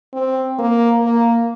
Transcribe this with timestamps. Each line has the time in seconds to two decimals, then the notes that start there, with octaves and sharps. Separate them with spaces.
0.14 C4
0.59 A#3
1.04 A#3